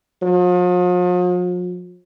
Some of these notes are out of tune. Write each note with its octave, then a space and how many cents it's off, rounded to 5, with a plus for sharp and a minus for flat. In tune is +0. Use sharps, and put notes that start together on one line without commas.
F3 +45